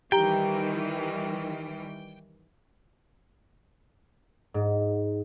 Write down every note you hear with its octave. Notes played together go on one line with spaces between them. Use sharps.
D#3 E3 G3 G4 G5 A#5 G7
G#2